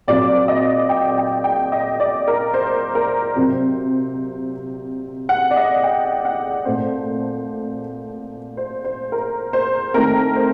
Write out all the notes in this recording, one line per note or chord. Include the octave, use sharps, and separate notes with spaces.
A#2 F#3 C4 D5
D#5
G5
G5
G5
D#5
D5
A#4
C5
A#4
C3 F#3 C4 C5
F#5
D5
D#5
G5
F#5
A#2 A3 C4 C5
C5
C5
A#4
C5
D#3 A3 C4 A#4
C5